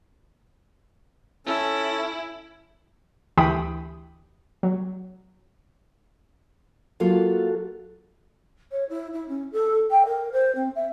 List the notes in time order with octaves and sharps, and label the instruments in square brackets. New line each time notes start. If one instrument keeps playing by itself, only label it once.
[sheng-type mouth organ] C#4 A4 [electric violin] E4
[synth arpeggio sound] D2 E3 G4 G5 B5 D#6
F#3
[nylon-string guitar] F#3 A#3 F4 [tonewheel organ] F#4 A4
[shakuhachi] C#5
E4
E4
C#4
A4
G5
A#4
C5
C4
E5